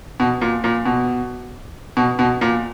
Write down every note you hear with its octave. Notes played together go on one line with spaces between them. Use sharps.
B2
A#2
A#2
B2
B2
B2
A#2